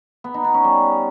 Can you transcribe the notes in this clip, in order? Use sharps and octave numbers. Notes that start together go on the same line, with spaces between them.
B3
D#4
B3
C#4
G3